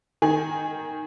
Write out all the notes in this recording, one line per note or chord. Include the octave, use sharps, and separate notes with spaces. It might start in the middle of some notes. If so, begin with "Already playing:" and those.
D#3 G#5